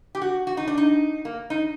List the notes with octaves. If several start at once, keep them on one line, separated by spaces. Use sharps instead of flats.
G4
F#4
F#4
D#4
D4
D#4
A#3
D#4